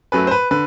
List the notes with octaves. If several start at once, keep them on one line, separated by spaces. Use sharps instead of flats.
F#2 F#3 A3 B4
C5
B4
D3 B4